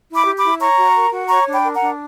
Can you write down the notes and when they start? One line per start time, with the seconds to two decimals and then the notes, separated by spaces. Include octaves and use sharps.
0.09 E4
0.14 B5 D6
0.26 G4
0.38 B5 D6
0.44 E4
0.60 C#5 A#5 C#6
0.77 F#4
0.95 A#4
1.12 F#4
1.29 C#5 A#5 C#6
1.47 D4
1.52 G5 B5
1.64 A#4
1.74 F#5 A#5
1.80 D4